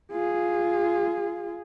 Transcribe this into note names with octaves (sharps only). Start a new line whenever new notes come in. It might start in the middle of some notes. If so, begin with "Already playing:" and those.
F4 G#4